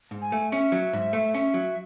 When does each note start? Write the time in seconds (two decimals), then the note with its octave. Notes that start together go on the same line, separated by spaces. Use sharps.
0.11 G#2
0.22 G#5
0.32 A3
0.52 C#4 E5
0.72 F#3
0.93 G#2
1.13 A3
1.34 C#4
1.54 F#3